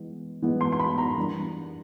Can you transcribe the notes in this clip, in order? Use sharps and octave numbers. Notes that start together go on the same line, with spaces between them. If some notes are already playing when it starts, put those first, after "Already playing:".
Already playing: E3 G#3 B3
E3 G#3 B3
C6
C6
B5
A#5
E3 G3 A#3 D4